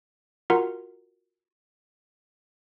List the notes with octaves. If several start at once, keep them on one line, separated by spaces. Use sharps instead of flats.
F4 F#4 A#4 F#5 A#5 C6